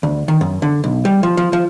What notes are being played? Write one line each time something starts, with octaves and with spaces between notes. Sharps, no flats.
D2
D#3
F#2
D3
B1
G3
F3
F3
F3